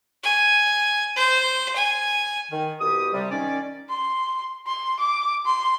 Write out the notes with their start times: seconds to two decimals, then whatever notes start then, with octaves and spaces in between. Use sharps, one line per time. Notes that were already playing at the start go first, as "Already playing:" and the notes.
0.24 G#5
1.16 C5
1.76 G#5
2.51 D#3
2.80 C2 B2 G4 D#6
3.13 C3 G3
3.31 D#3 C#4 D5
3.90 C6
4.67 C6
4.99 D6
5.46 C6